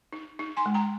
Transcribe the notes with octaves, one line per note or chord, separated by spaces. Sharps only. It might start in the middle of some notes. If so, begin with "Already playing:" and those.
D#4
D#4
G#5 C6
G#3
G5 A#5